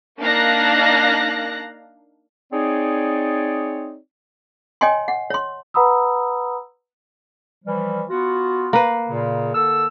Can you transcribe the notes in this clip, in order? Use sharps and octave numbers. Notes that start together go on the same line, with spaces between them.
A#3 D4 D#4 F5 F#6 A#6
C4 D#4 G#4 C#5 D5
C#5 D#5 G5 G#5 C6
F#5
C#5 C6
B4 F#5 A#5 B5 D#6 E6
E3 F3 G3
B3 F4 F#4
A#3 B4
A#2 C#3
D3 A4 E6